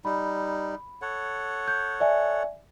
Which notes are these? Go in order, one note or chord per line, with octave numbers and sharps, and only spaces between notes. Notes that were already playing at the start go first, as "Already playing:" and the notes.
G3 D#4 B5
A4 C#5 F#5
G6
D5 E5 G#5